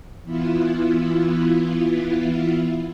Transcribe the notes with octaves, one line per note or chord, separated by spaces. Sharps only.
E3 B3 E4 F4